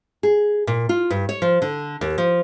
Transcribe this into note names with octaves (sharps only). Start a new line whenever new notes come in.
G#4
A#2
F4
G2
C#5
F3
D3
D#2
F3